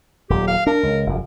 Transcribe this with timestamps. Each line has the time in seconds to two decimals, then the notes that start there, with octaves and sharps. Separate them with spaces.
0.30 D#1 F#3 G4
0.47 F5
0.67 D4 A#4
0.83 C#2
1.06 F1 F#2